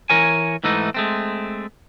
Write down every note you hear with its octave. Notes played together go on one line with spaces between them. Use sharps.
E3 A#4 C#5 G#5
G#2 E3 A3 D#4
G#3 A3 C4